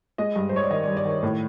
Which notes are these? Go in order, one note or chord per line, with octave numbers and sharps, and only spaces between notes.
G#3 D#5
G2
C5
G2 C#5
D5
D#3 D#5
D5
G2
D5
D#3 C#5
A2